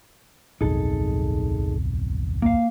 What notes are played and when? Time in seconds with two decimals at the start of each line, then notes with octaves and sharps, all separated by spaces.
0.61 D1 B1 F2 D#4 G#4 A4
2.42 A#3 F5